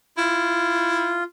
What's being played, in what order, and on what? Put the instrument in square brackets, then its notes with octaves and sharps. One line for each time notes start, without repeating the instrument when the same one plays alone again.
[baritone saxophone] E4 [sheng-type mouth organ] F4